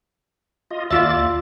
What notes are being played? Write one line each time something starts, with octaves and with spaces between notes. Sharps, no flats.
F4 D#5
D#2 F4 D5 E5 A6